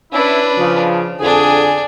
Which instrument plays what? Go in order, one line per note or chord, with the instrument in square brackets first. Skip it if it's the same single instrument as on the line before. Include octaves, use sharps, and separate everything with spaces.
[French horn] C#4 [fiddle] D4 B4 [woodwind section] E4
[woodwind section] C#3 [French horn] F3
[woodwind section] F2 G#4 [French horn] D3 [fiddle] D4 G#5